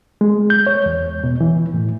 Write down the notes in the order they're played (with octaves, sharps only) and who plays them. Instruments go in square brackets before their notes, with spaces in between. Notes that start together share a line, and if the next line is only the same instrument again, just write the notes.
[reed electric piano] G#3
G6
C#5
E2
B2
E3
A2